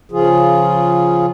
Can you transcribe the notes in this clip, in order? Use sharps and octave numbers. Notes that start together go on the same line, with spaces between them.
C#3 F3 F4 G#4